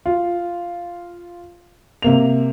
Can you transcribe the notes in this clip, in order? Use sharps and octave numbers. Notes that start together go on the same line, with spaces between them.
F4
C3 A#3 F7